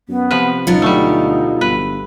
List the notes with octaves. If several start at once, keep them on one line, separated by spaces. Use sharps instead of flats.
F#2 B3
C3 F3 B4
C#2 B2 F#3 D#4 F4
D2 G3 A3
G1 B4